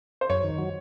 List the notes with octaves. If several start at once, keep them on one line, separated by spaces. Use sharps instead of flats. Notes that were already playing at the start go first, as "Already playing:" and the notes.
C5
F#2 C#5
D#3
F#3